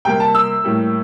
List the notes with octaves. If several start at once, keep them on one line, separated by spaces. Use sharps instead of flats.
C3 G3 A#3 G5
A5
E6
A2 G3 A#3